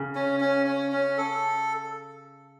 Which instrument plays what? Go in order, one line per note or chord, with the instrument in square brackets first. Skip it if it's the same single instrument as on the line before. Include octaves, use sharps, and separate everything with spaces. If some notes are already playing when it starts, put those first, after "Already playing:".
Already playing: [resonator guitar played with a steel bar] C#3
[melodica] C#4
C#4
C#4
C#4
A4